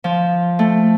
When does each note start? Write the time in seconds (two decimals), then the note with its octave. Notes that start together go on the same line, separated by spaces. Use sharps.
0.04 F3
0.59 A3